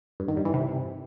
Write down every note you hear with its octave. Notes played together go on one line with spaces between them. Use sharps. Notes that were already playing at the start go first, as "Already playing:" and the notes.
G2
D#3
G2
E3
C3